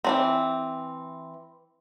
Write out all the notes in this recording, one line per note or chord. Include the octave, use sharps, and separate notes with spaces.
E3 F#3 C4